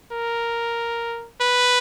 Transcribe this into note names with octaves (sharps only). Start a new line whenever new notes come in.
A#4
B4